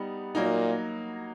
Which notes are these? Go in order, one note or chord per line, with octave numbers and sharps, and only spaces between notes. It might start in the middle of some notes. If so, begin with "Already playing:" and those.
Already playing: G3 B3 D#4
A#2 F#3 A#3 D#4